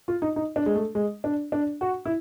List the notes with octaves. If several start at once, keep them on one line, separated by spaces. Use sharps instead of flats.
F4
D#4
D#4
D4
G#3
A3
G#3
D4
D4
F#4
E4